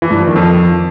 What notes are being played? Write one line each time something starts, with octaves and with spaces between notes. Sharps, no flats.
E3
G2
F3
D#3
F2